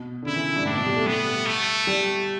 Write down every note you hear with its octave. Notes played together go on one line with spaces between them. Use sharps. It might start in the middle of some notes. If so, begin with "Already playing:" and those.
Already playing: B2
D3
C#3 E4
E3
G2
A2 D4
B2
G3
A3
G3 B3
A3
G3